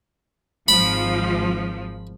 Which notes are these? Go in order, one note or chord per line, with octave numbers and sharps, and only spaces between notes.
G#1 F3 B5